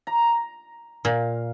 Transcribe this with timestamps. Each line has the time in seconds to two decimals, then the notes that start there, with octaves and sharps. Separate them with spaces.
0.07 A#5
1.05 A#2 F5